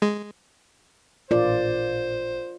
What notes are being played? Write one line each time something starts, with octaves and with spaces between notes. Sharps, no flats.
G#3
A1 A#2 F4 A#4 C5 D5